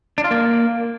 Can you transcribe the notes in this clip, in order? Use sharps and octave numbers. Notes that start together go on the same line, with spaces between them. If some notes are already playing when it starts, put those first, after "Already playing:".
D4
F4
A#3